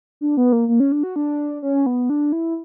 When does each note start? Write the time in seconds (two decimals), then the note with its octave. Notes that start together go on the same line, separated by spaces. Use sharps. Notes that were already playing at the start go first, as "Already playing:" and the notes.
0.21 D4
0.37 B3
0.52 A#3
0.68 A#3
0.80 C#4
0.92 D4
1.03 F#4
1.16 D4
1.62 C#4
1.86 B3
2.10 D4
2.32 E4